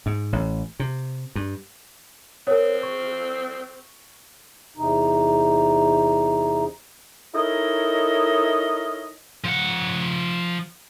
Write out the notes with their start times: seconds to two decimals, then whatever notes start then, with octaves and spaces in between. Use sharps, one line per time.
0.06 G#2
0.33 A1
0.80 C3
1.35 G2
2.47 C4 A#4 B4 C#5
2.83 C#6
4.77 E2 C3 D#4
7.34 D#4 E4 A4 A#4 C#5 D#5
9.44 F3 F#5